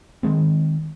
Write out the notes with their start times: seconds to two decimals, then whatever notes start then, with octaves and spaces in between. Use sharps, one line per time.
0.23 D#3 F#3 G#3 C4